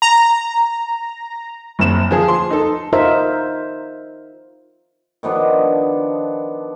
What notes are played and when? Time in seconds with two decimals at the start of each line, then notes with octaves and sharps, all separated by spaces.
0.02 A#5
1.79 F#1 C4 E7
2.11 F3 G#4
2.28 C6
2.50 D#4 A4
2.93 D#4 F4 A#4 C5 E5
5.23 D#3 F3 B3 D4